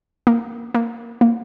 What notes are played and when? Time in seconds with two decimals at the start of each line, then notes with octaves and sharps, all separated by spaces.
0.27 A#3
0.74 A#3
1.21 A#3